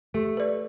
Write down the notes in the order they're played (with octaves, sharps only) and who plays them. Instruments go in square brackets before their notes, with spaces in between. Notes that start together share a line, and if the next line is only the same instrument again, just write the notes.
[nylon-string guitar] A3 [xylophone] G4
[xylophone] B4 D5